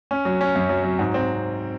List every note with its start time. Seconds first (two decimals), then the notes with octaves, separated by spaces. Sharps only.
0.11 C#4
0.25 F#3
0.41 C#4
0.55 F#2
0.69 F#3
0.84 F#3
0.99 G#2
1.14 C4